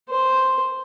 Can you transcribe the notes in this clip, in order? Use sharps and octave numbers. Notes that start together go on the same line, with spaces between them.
C5